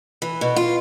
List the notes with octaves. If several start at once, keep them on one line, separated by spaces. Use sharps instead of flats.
E3
B2
F4